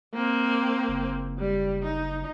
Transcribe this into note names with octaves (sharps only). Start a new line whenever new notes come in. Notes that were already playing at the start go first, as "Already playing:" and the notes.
A#3 C4
F#1
G3
D#4